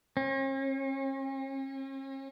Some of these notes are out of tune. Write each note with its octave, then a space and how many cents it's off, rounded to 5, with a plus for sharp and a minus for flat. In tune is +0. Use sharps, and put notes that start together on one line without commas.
C#4 -45